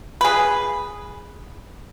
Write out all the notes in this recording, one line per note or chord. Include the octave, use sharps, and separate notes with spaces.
G#4 B4